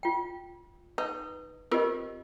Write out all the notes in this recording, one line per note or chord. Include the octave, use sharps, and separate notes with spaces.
F4 G5
D#4 B4
C4 F4 G4 A#4 B4 D#5